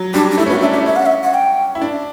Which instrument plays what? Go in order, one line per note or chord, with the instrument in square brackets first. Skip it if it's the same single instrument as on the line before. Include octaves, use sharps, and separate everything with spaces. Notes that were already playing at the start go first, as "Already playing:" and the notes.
Already playing: [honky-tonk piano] F#3
[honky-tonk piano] G3 [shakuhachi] D4
[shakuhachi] D4
[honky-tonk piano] A3 [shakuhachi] E4
[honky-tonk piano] C#4
[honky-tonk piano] B3 [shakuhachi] F#4
[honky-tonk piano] D4 [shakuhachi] E5
[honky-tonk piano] E4 [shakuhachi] D5
[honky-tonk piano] C#4 [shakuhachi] E5
[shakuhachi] F#5
E5
F#5
G5
[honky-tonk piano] E4
D4